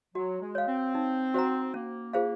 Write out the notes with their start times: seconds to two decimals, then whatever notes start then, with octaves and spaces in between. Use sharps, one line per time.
0.15 F#3 F#4
0.41 G#3
0.55 C#5 F5
0.67 C4
0.95 D#4
1.34 F#4 C5 F#5 A#5
1.74 A#3 C#4
2.13 F4 G#4 C5 F5